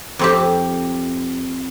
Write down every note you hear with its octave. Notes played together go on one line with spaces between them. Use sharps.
F2 C4 G4